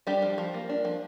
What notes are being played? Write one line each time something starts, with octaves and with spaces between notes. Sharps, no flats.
G3 D4 G4
F3
F3
A#3
D4
F3